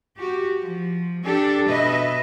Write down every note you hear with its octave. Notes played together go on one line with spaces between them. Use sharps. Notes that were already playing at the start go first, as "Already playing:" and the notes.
F#4 G4
F3
D4 G4 A4
B2 B4 D#5 E5